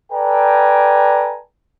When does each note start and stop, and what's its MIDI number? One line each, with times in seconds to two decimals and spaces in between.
0.12 1.39 69
0.12 1.39 71
0.12 1.39 74
0.12 1.39 79
0.12 1.39 80
0.12 1.39 82